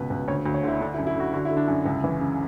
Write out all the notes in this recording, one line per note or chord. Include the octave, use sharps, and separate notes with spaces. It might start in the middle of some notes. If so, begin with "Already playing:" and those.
Already playing: C#2 B2 B4
C#2
D2 C#5
D2
C#5
D3 E4
D3 D4
E4
F#2
E4
D3 F#4
D3 F#4
E4
D3
D4
F#2 E4
C#2
E3
C#3